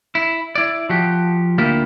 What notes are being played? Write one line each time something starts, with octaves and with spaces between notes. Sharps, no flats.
E4
E4 D5
F3 F#4 G4
D2 A#3 E4 F4 G4